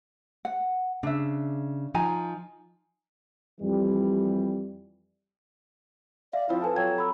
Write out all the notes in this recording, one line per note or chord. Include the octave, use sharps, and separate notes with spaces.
F#5
C#3 D4 E5
F3 D#4 G#5 A#5
F2 E3 G3
D5 E5 F5
F3 C4 E4 F4
A4 B4 G#5 A5
F#3 G5 G#6
B5 E6